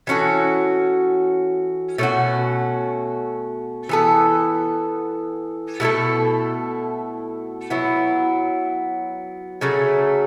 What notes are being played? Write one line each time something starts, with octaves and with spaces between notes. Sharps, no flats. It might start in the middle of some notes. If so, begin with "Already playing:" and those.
E3 C#4 F#4 A4
B2 A3 C#4 F#4
E3 B3 A4
B2 A3 E4 A4
F#3 B3 E4
C#3 F#3 A3